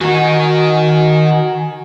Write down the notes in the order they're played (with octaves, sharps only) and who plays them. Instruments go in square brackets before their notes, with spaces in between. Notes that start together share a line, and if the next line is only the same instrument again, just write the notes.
[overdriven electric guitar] D#3 D#4 [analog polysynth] F#4 G#5